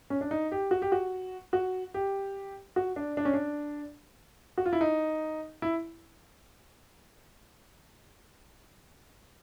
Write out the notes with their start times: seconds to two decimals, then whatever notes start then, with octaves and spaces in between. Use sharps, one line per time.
0.10 C#4
0.21 D4
0.31 D#4
0.52 G4
0.71 F#4
0.82 G4
0.92 F#4
1.53 F#4
1.94 G4
2.76 F#4
2.96 D4
3.17 D4
3.25 C#4
3.34 D4
4.58 F#4
4.66 F4
4.73 E4
4.81 D#4
5.62 E4